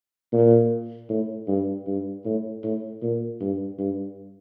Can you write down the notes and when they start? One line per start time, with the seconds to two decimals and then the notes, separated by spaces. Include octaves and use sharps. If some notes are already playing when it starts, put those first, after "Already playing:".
0.33 A#2
1.09 A2
1.48 G2
1.87 G2
2.25 A2
2.63 A2
3.02 A#2
3.41 G2
3.78 G2